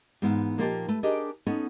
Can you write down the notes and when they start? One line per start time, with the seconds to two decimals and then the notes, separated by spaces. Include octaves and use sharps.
0.22 G#2 E3 B3 E4 C5 F5
0.58 A#2 F3 A#3 D#4 G4 A5
0.88 A3 B4
1.03 D4 G4 G#4 A#4 D#5
1.47 B3 C#4 D#4 A4